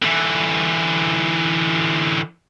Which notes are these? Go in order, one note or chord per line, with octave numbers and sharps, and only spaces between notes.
D3 E3